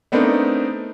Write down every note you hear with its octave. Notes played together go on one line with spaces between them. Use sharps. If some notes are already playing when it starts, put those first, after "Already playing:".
A3 B3 C4 D4 D#4 A#4